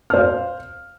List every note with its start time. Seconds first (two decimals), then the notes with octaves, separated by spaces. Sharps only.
0.10 F6
0.14 C5
0.17 F5